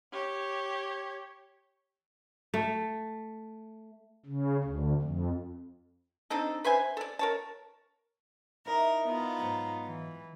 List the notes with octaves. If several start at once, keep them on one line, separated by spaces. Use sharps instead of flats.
G4 C#5
A3
C#3
D2
F2
C4 D4 D#4 A4
B4 C5 E5 G#5
A4 D5
A#4 C#5 A5
D#4 E4 A#4 E5
B3 D#4 F4
G#2 F#3 A#5
E3